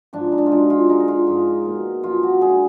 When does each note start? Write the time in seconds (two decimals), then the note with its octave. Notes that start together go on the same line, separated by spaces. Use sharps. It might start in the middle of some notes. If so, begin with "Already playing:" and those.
0.13 G#2 F3 G#3 D4
0.32 D#4
0.38 D4
0.46 F4
0.52 F#2 F3 G#3 D#4
0.70 F4
0.89 D3 G#3 D#4
1.00 D#4
1.08 F4
1.27 G#2 F3 G#3
1.66 B2 A#3
2.04 F#2 F3 G#3 F4
2.23 F#4
2.41 D3 G#3 G#4